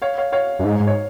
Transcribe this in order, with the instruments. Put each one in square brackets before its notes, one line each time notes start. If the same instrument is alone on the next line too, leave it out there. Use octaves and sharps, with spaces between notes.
[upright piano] C#5 F5
C#5 F5
C#5 F5
[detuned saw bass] F#2
G#2
G#2
[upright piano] C#5